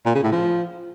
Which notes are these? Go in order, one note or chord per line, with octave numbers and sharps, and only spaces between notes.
A#2
C#3
A2
F3